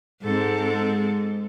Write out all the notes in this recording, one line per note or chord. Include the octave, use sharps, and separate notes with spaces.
G#2 G#3 C4 A4